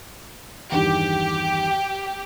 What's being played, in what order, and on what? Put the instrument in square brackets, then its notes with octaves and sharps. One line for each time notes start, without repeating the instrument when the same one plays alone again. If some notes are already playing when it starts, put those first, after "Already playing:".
[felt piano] E2 G2 D#3 [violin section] G4